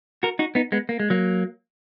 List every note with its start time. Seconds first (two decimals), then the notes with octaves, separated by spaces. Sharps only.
0.23 F#4 A#4
0.39 D#4 F#4
0.55 B3 D#4
0.72 G#3 B3
0.89 A#3
1.00 G#3
1.10 F#3 A#3